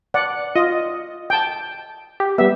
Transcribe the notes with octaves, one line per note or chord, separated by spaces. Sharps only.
D5 F#5
F4 D#5
G5 A5
G4
G3 B3 E5